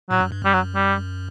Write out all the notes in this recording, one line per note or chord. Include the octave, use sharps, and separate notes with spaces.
A2 F#3
F#2
G2
F#2 G3
F#3
G3